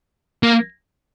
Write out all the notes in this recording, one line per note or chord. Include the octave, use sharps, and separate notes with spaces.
A#3